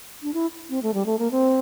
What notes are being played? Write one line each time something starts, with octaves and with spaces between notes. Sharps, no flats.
D4
E4
C4
A3
G3
A3
A#3
C4